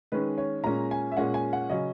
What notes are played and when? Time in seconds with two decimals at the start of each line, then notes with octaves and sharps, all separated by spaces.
0.12 D#3 G#3 C#4 B4
0.38 C#5
0.64 A#2 G#3 C#4 A#5
0.91 G#5
1.12 E5
1.17 A#2 G#3 C#4 F#5
1.34 G#5
1.53 F#5
1.70 C#3 F#3 C#4 D#5